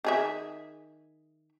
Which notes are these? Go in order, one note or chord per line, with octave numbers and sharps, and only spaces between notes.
D#3 G#4 E5